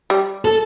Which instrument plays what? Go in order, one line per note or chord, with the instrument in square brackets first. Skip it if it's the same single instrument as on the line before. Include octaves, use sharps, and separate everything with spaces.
[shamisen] G3
[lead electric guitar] A4